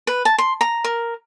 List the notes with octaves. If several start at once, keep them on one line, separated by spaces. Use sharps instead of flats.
B4
A5
C6
A#5
A#4